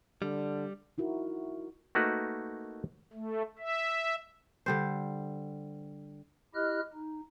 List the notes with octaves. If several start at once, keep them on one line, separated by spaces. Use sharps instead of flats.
D3 G3
D#4 E4 F#4 A#4
A3 A#3 D#4 F#4 A#4 B4
A3
E5
D3 G3 C5
E4 G4 D#5 F6 F#6
D#4